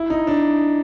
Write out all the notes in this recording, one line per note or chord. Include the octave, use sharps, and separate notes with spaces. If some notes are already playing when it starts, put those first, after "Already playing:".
Already playing: E4
D#4
D4